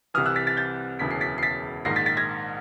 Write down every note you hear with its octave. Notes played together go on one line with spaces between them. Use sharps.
C2 C3 E3 D#6 F6
E6 F#6
A6 B6
A6 B6
G6 A6
E1 D2 C#3 E3 B6
C7
A6 B6
C7
A6 B6
A#1 G#2 D#3 A#6 C7
A6 B6
A6 B6
G#6 A#6